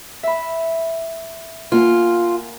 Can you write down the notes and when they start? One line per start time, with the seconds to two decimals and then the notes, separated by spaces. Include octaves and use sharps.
0.23 E5 B5
1.72 A#3 F4 F#5 G#5